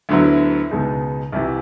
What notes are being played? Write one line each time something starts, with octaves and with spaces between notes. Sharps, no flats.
D2 D3 F#3 B3 E4
C#2 B2 G#3 B3 D#4
C2 C3 E3